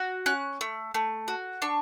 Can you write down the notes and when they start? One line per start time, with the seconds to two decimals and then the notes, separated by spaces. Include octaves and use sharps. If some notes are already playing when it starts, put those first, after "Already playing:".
Already playing: F#4
0.26 C#4 F#6
0.61 A3
0.94 A3
1.28 F#4
1.62 D4 C#6